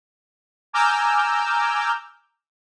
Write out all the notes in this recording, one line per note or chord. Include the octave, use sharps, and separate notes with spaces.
G#5 A#5 D6 E6 F6 G6